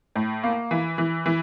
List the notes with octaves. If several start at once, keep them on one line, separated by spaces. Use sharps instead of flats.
A2
A#3
E3
E3
E3